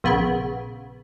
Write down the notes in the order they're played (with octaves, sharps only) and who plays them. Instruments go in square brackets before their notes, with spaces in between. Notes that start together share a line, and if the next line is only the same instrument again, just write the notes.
[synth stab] A#1 C#3 B3